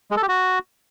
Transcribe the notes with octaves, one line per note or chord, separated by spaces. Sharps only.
G#3
A4
G4
F#4